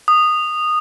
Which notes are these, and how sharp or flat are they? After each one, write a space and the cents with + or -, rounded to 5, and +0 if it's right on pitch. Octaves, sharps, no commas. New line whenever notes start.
D#6 -15